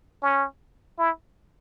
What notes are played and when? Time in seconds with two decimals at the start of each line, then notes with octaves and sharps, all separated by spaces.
0.23 C#4
0.99 E4